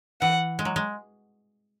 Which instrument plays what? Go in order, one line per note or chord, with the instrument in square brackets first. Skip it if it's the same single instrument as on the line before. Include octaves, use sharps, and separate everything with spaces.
[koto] E3 [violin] F#5
[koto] G#3
F#3
G#3